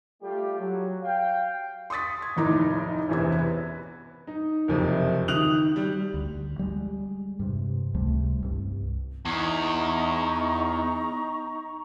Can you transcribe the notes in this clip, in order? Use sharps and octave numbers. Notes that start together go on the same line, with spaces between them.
G3 A3 F4 G4
F#3
F5 G5
C6 C#6 D#6 A6 B6
G#6
F1 D#2 A2 D#4 A#5 D6
E1 A1 E2 C3 C4 G#6
B4
D#4
F#1 F2 C3
D#3 D#6 F#6 F7 F#7
G3
D2
G3 G#3
G2 C3
C#2 C3 G3 A3
C2 G2
E2 D#4 A#5 C#6